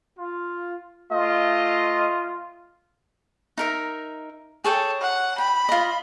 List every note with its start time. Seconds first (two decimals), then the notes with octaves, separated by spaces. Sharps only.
0.17 F4
1.11 A3 F4 D#5
3.58 D#4 A#4 E5
4.64 G#4 A4 C#5 G5
5.01 F#5
5.38 G5 B5
5.69 F4 D#5